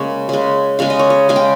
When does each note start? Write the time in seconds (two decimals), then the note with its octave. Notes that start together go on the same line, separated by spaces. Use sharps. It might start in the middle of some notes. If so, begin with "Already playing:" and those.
Already playing: C#3 G#3 A#3 C#5
0.29 C#3 G#3
0.79 C#3 G#3 F5
0.90 D#5
0.99 C#5
1.10 D#5
1.29 C#3 G#3 F5
1.36 G5